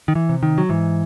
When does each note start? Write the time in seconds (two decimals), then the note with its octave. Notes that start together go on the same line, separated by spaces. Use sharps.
0.08 D#3
0.15 E3
0.29 C3
0.43 D#3
0.58 F#3
0.69 G#2 E3